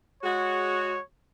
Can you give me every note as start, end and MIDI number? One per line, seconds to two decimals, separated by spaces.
0.23 0.95 56
0.23 0.95 66
0.23 1.03 73